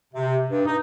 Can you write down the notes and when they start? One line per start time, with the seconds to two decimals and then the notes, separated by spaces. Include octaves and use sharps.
0.14 C3
0.49 G2
0.66 D#4